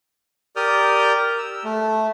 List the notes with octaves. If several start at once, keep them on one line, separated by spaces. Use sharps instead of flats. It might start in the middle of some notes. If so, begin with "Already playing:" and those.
G4 A#4 D5 D#6 F6 G6
E6
A3